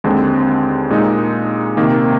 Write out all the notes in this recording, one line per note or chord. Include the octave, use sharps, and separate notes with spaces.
D#2 D3 G#3 C4
A#2 G#3 D#4
C3 D#3 A#3